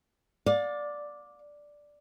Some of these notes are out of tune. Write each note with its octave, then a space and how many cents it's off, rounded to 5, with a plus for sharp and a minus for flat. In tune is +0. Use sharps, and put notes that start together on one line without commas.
D5 +0 F5 +40